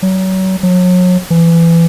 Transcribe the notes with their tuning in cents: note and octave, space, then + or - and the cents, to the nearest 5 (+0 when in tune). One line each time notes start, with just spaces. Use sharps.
F#3 +30
F#3 -35
E3 +25